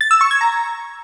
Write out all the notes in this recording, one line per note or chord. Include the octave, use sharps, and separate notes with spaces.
A6
E6
C#6
G#6
A#5